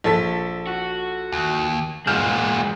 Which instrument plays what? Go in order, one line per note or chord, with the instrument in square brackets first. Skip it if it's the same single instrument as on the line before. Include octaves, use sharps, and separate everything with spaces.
[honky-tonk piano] A#1 A4 B6
[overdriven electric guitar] F#4
[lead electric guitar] D#2
[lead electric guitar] E2 A#2 [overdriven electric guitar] G#3 B3 [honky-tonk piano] F6 G6 E7